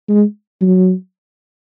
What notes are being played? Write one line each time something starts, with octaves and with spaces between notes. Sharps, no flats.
G#3
F#3